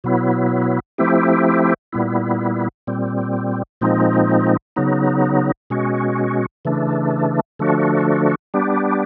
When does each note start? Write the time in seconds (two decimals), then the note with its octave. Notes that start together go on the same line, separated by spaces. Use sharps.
0.04 B2 F#3 B3 E4
0.98 F3 A3 C4 E4 G4
1.93 A#2 G3 B3 E4
2.87 A#2 G3 C4
3.81 A#2 F3 G#3 C4 D#4
4.76 C#3 F#3 B3 D#4
5.70 B2 G#3 C#4 F#4
6.65 C#3 E3 A3 D4
7.59 D3 F3 A3 D4 F#4
8.54 G3 B3 D4 G4